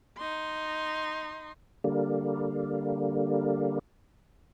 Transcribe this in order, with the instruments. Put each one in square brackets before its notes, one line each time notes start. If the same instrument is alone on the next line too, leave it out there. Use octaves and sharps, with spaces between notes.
[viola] D#4 C6
[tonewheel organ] D3 G3 A#3